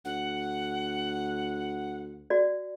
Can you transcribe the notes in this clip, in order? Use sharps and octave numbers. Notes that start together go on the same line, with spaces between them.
D2 F#5
F#4 D5